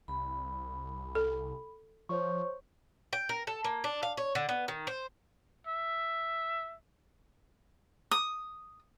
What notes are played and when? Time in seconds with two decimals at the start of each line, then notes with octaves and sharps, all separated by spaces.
0.08 C2 B5
1.15 A4
2.09 F3 C5 C#5 C#6
3.13 G5
3.29 A#4
3.47 A4
3.65 A#3
3.84 D4
4.03 F5
4.17 C#5
4.35 D3
4.49 B3
4.68 D#3
4.87 C5
5.67 E5
8.11 D#6